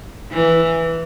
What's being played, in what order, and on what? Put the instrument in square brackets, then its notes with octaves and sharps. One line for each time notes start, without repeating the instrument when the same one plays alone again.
[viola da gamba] E3